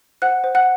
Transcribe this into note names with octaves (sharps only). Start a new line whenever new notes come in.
C5 F#5 F#6
C5
F#5 F#6